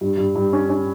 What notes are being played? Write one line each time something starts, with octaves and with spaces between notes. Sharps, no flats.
G2
G2
G2
C#4
C#4